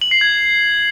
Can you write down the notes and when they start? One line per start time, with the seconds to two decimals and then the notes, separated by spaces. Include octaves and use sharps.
0.01 F#7
0.11 C7
0.21 G#6